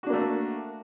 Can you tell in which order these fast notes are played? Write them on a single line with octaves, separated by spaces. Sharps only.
F#4 D4 A#3 A3